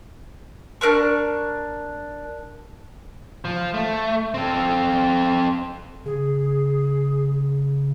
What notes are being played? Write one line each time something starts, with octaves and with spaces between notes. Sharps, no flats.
D4 A#4 B4 C#6
F3
A3
C4 A4
C#3 G#4